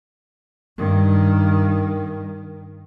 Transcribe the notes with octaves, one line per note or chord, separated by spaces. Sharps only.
G2 D#3